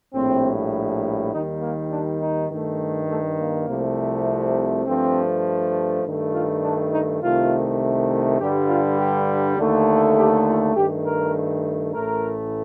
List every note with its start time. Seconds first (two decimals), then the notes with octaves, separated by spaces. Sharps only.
0.14 A#1 A2 G3 C4
1.32 D#2 D#3 G3 D#4
1.62 A#3
1.91 D4
2.20 D#4
2.50 G2 D#3 A3
3.09 A3
3.39 A#3
3.69 C2 C3 F3 A3
4.86 G2 F3 A3 C4
6.04 G2 D#3 A3
6.33 F4
6.64 D4
6.92 D#4
7.22 C2 C3 D#3 A3 F4
8.40 G2 D3 G3 G4
8.69 F4
8.98 G4
9.58 D#2 D3 A3
10.16 G4
10.47 F4
10.76 G2 D#3 A3 G4
11.06 A#4
11.94 A1 A2 A3 A#4